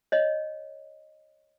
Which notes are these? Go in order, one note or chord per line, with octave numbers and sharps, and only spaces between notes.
C#5 D#5